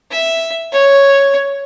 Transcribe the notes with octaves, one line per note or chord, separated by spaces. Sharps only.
E5
C#5